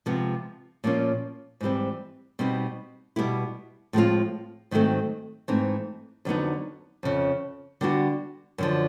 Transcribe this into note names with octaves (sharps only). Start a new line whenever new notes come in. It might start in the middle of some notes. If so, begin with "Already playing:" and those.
C3 F3 G#3 B3
A#2 F3 A#3 C#4 F4
G#2 E3 G3 C4
B2 G3 C4 D#4
B2 G3 B3 E4
A2 F3 G#3 C4 F4
G#2 D#3 F#3 A3 C4
G#2 E3 A3 C4 D#4
F2 D3 F#3 B3 D#4
F2 C#3 F3
D3 G3 B3 D4 F#4
F#2 D3 F3